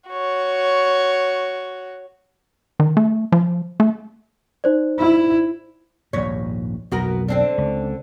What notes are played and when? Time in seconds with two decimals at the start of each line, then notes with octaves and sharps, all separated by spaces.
0.10 F#4 C#5
2.80 D#3
2.97 A3
3.32 F3
3.80 A3
4.64 D#4 C5 D5
4.99 E4
6.13 A#1 D#2 G#2 C#5
6.92 B1 F2 B3 F#4 A#4
7.28 D3 C4 D4
7.58 C#2